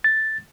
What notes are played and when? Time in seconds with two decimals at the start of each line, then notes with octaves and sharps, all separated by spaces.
0.04 A6